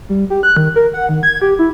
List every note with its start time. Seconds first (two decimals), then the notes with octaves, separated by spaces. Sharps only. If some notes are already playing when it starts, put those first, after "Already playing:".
0.09 G3
0.30 G4
0.43 F#6
0.57 D#3
0.76 A#4
0.94 F#5
1.09 D#3
1.23 G#6
1.42 G4
1.59 E4